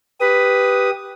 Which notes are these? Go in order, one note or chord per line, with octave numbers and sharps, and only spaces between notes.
G4 B4 D#6